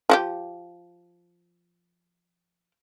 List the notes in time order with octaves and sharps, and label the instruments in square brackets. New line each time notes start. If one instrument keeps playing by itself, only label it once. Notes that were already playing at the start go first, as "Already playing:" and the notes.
[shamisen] F3 F#4 G4